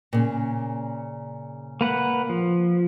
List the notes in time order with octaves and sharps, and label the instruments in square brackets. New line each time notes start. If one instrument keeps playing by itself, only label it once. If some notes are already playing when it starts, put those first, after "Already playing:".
[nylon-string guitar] A#2 C#3
[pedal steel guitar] A#3 B4 F#5
F3